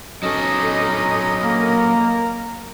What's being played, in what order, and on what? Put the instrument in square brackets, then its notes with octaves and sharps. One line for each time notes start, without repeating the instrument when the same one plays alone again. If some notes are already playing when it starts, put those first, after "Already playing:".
[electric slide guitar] F#3 A4 [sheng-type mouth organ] C#4 D#5 [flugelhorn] D#4
[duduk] A#3 [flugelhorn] A#4